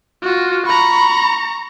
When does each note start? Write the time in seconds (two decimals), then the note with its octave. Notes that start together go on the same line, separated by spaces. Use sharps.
0.23 F4 F#4
0.67 A#5 B5 C#6